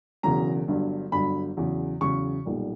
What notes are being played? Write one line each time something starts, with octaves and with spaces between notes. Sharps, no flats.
E1 E2 C#3 F#3 A#5
G1 G2 F#3
G1 G2 F#3 B5
E2 C#3 F#3
E2 C#3 F#3 C#6
B1 A#2 G3